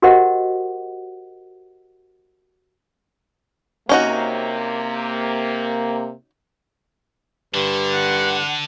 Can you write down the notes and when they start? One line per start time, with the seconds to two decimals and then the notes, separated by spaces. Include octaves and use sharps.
0.02 F#4 G4 A#4 C5 D#5 F#5
3.89 C3 A#3 C#4 D#4 F#4
7.54 G2 D3
7.93 F#5